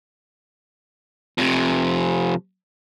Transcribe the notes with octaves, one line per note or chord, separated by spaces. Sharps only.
F2 C3